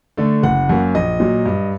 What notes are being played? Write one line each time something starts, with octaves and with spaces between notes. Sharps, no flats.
D3 A3
F#1 F#5
F#2 F#3 A#3
A#1 D#5
A#2 F#3
G2